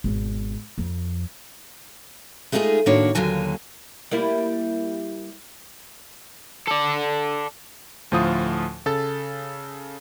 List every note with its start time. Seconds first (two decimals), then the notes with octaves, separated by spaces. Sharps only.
0.04 G#1 B2
0.78 F2
2.52 G#3 A3 D#4 F4 G4 G#4
2.86 A2 D#3 A#3 D4 F#4 C#5
3.15 D#2 A#2 D3 F#3 G#5
4.11 G3 A#3 E4
6.67 A4 D5
8.12 D2 A2 F3 F4 D#6
8.86 C#3 A4 A6